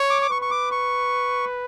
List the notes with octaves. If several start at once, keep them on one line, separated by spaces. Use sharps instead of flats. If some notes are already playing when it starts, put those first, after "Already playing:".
Already playing: C#5
D6
D6
B4 C#6
C#6
D6
C#6